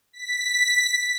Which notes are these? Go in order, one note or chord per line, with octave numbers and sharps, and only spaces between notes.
B6